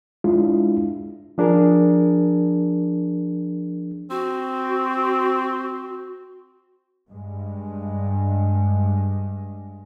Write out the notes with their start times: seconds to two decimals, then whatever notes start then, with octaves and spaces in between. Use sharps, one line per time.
0.24 G#3 D4 E4 F4
1.38 F3 D4 G#4 A#4
4.11 C4 F#4
7.10 G2 G#3